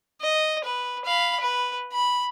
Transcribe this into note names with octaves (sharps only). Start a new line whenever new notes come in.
D#5
B4
F5 B5
B4
B5